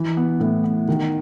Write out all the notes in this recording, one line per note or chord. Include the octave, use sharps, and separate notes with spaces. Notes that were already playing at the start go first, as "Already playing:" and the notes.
Already playing: E3
B3
A2
B3
D#3